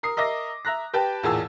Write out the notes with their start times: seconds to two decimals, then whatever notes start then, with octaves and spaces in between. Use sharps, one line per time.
0.03 A#4 D#6 C7
0.17 A#4 D#5 E5 D6 A#6
0.65 E5 A#5 F#6 A#6
0.93 G4 B4 G5 A5
1.23 A1 E2 A#2 G#4 A5 E6